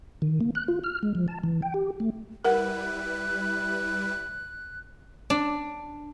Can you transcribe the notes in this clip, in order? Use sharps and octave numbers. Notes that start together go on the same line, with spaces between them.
D#3
A#3
F#6
F4
F6
G#3
F3
A5
E3
G5
G4
A3
G3 E4 A#4 B4 F#5 F#6
D4